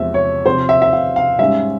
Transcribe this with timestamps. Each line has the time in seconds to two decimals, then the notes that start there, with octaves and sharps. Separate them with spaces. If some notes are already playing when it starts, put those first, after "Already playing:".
Already playing: E2 C3 F3 G#3 E5
0.14 C#5
0.46 C3 F3 C4 C5
0.69 E5
0.82 E5
0.93 F5
1.16 F5
1.39 G#2 G3 C#4 E5